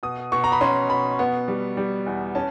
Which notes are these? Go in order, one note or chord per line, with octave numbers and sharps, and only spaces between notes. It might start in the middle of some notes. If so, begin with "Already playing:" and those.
B2 D#6
B2 C#6
A#5
B5
C#4 C6
B2 B5
B3
G3
G3
E2
C#4 A5